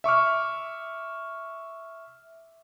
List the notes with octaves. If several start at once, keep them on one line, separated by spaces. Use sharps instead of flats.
E5 C#6 D6 F6